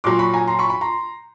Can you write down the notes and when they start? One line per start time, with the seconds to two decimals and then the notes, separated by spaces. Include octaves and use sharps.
0.04 A#2 F#3 C6 D6
0.19 B5 C#6
0.34 G#5 A#5
0.47 A#5 C6
0.59 B5 C#6
0.70 B5 C#6
0.81 A#5 C6